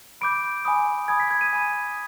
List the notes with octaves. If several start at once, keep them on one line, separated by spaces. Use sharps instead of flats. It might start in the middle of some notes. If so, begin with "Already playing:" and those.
B5 D6 G6 D7
G#5 B5 D#6
G#5 B5 D#6 G#6
B6
G#6
D#7
G#5 B5 D#6